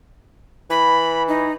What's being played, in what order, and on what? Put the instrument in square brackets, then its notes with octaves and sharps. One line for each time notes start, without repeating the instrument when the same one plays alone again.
[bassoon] E3 [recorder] B5
[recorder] D#4